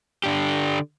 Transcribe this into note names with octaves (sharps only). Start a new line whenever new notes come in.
D3 D4 G4